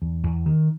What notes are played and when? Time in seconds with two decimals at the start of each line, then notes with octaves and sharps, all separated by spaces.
0.02 E2
0.23 E2
0.46 D#3